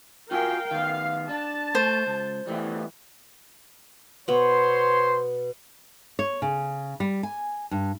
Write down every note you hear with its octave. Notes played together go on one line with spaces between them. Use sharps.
F4 F#4 A#4 F5 G5 G#5
D#3 B3 F5
D4 A5
A3 C5
C#2
E3 G3 A3 B3
B2 B3 C5 C#5 C6
C#5
C#3
G3
G#5
G2